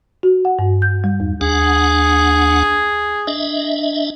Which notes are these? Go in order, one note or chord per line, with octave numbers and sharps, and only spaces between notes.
F#4
F#5
G2
G6
G3
E2
D#2 D4 G#4 F#5
D4 D#5 E5